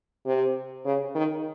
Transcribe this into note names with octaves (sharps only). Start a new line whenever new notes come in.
C3
C#3
D#3